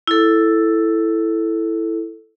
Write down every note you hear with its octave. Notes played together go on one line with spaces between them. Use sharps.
E4 A4